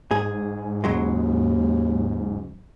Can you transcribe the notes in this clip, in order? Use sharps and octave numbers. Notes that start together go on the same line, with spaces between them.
G#2 G#4
D#2 C#3 F#3 G#3